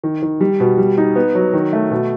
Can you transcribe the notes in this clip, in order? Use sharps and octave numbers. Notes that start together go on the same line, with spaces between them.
D#3
D#3
G3
B2
G3
D#4
B3
F#3
D#3
A3
B2